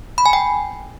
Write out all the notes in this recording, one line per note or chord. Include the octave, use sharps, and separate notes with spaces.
B5
G#5
G5